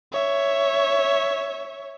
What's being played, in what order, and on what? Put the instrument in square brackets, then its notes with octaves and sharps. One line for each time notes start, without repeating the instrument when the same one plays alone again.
[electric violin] C#5 E5